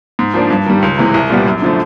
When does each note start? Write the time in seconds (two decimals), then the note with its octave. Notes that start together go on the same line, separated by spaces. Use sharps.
0.19 G#2
0.34 F3 A#3 D4
0.50 G2
0.66 D#3 G3
0.82 C#2
0.98 C3 E3 G#3
1.14 C2
1.30 A#2 G3 B3
1.46 F#2
1.62 D3 F3 A3